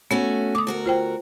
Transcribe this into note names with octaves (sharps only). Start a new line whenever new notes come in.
A3 B3 C#4 F#4
D3 D6 D#6
D2 F#4 A#4
F4 C5 G5